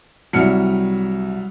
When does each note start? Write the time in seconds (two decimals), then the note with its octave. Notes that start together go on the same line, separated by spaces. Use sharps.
0.33 C2 F#3 G3 F6 C#7